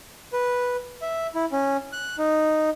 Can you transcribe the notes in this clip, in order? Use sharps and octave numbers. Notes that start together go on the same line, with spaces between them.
B4
E5
E4
C#4
F#6
D#4